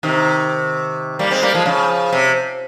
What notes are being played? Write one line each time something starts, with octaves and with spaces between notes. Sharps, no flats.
C3 D#3
G3 A#3
G#3 C4
G3 A#3
F3 G#3
C#3 F3
C3